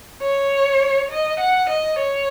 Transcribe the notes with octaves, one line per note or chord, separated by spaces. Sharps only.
C#5
D#5
F#5
D#5
C#5